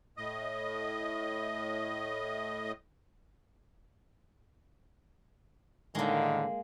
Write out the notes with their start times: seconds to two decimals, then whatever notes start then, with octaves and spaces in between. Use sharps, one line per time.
0.17 A2 D#5
5.95 A2 D3 D#3 G#3 A#3